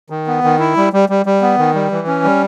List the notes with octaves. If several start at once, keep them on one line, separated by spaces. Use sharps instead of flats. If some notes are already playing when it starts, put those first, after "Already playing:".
D#3
B3
D#3
E4
G3
G3
G3
G3
B3
D#3
G3
E3
C#4
G3